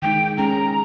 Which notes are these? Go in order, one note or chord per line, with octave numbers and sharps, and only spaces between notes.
D#3 G#3 D#4 G5
G#3 C#4 G#4 A#5